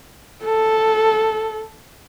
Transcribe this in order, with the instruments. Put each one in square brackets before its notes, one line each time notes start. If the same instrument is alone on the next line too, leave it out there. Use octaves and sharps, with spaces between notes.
[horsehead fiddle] A4